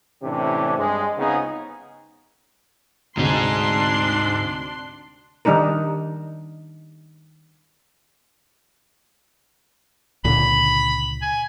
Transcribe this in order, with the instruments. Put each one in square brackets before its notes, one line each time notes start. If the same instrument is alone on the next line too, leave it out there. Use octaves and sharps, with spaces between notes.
[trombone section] A2 C3 E3 C#4 D4 G4
G2 G#3
C#2 C#3 B3 C4 D#4 G#4
[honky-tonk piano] D2 C3 [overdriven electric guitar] G#2 D#4 [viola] D4 C6
[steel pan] D#3 G3 D4 D#4 A#4
[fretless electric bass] C#2 A#2 D3 [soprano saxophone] B5
[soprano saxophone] G#5